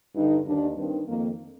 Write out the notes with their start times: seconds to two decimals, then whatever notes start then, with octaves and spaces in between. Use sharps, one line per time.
0.15 G2 D3 D#4
0.46 D#2 D#3 D4
0.76 G2 D#3 C4
1.07 F2 D#3 A#3